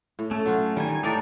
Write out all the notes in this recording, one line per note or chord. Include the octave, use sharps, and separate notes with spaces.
A2
A3 C#4
F#3 F4 F#4
D#3 G3 G#5
A2 D4 D#4 G4 D5 A5